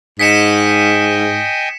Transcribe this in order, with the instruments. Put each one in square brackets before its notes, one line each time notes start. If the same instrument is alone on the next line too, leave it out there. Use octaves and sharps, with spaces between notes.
[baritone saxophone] G#2 [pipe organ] D#5 G5 G#5 [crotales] B6 C#7 E7